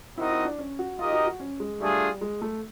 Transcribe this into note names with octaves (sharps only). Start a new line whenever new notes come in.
C4 D#4 E4 F#4 A#4 D#5
E4
D4
C#4
F#4
D#4 F4 G4 A#4 D#5
F#4
F#4
C#4
G#3
G3 A3 D4 F4 G#4
G#3
A3